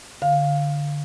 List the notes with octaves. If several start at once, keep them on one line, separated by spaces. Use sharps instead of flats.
D3 F5